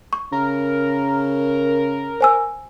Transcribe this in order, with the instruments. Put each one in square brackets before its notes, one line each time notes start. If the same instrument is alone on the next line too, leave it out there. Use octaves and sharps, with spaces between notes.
[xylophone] C#6
[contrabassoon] C#3 [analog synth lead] A#4
[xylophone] C5 G#5 E6